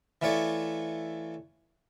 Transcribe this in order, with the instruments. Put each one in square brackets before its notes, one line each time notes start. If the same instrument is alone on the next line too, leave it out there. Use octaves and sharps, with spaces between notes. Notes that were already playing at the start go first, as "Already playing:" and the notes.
[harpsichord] E3 A3 F4 C#5 D5